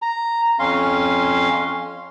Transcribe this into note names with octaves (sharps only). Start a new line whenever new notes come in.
A#5
F2 C#4 F5 C6